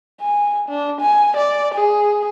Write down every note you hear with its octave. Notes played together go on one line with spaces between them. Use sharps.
G#5
D4
G#5
D5
G#4